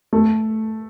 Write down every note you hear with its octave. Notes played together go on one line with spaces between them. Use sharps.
A3